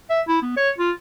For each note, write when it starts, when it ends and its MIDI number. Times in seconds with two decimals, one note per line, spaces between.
0.10 0.21 76
0.28 0.39 64
0.42 0.54 59
0.57 0.70 73
0.78 0.91 65